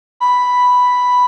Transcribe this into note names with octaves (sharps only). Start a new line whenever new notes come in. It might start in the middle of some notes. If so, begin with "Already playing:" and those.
B5